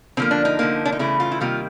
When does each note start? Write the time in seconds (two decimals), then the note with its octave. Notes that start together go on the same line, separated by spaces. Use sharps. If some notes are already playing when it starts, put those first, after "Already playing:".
0.17 D3 F3 A#3 C4
0.31 D4
0.45 D#4
0.59 D3 F3 A#3
0.85 D4
0.92 D#4
0.99 C#3 E3 A3 E4
1.20 F4
1.32 E4
1.41 C3 D#3 G3 A#3 F4